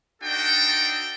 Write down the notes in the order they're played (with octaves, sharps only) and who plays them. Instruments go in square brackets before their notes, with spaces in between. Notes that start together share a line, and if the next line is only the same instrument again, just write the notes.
[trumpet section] D4 D#4 F#4 A4 G5